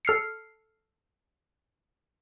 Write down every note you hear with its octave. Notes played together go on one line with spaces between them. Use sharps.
A4 F6 C7 C#7